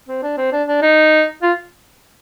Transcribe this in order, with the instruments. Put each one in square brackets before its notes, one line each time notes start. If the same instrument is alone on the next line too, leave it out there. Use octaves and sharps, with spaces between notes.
[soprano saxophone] C4
D4
C4
D4
D4
D#4
F4